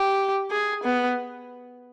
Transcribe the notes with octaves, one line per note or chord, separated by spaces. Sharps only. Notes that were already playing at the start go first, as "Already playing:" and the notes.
Already playing: G4
G#4
B3